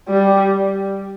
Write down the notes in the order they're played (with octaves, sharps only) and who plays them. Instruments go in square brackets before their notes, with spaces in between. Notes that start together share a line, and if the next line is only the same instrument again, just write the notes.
[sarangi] G3